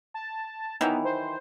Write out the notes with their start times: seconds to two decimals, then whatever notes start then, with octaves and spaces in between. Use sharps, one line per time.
0.14 A5
0.81 D#3 E3 F#3 B3
1.05 C5